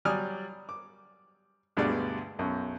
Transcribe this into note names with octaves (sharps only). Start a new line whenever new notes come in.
F#3 G3 D5 G#5 D#6 F6
D6
D2 G2 B2 G#3 D5
B1 F#2